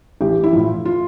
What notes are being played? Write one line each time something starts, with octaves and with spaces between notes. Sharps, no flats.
A1 G4
E4
A2 F3 F4
F4